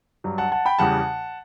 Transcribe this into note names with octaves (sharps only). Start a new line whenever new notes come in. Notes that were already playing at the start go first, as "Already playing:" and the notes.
G2 F#3
F#5 A5
F#5 A5
G5 B5
E2 C#3 G3 F#5 A5